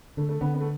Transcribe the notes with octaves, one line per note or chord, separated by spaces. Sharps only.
D3 A3
A3
D3 B3
B3
A3